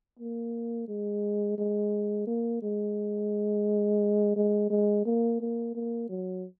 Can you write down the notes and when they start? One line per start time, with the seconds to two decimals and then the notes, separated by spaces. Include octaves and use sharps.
0.19 A#3
0.88 G#3
1.58 G#3
2.27 A#3
2.63 G#3
4.36 G#3
4.70 G#3
5.06 A#3
5.41 A#3
5.75 A#3
6.09 F#3